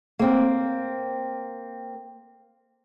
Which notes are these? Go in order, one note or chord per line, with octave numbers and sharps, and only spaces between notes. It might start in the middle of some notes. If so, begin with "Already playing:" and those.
A#3 C4